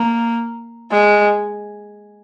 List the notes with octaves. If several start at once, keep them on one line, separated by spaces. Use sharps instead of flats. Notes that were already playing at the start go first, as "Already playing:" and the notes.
Already playing: A#3
G#3